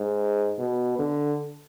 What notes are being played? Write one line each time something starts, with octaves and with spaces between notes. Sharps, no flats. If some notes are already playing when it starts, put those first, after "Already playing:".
Already playing: G#2
B2
D3